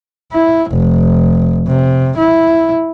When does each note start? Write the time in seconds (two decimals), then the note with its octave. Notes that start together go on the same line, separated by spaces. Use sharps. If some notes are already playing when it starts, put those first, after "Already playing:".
0.32 E4
0.71 F1
1.67 C3
2.17 E4